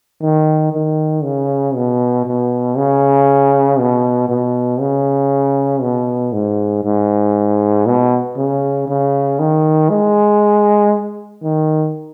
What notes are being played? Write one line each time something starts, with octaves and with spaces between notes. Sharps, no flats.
D#3
D#3
C#3
B2
B2
C#3
B2
B2
C#3
B2
G#2
G#2
B2
C#3
C#3
D#3
G#3
D#3